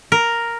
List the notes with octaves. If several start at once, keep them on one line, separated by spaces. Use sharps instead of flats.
A#4